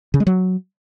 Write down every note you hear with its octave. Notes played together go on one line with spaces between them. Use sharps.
C#3
G#3
F#3